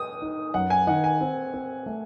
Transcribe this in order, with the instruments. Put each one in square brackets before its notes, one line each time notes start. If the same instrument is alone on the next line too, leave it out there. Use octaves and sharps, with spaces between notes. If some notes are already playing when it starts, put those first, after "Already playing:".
Already playing: [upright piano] D#6
[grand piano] D#4
[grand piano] F#2 [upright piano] F#5
[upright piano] G#5
[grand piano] D#3 [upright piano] F#5
[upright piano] G#5
[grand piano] C4
C4
A3